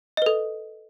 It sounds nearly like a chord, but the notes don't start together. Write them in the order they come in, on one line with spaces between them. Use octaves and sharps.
D#5 B4 A4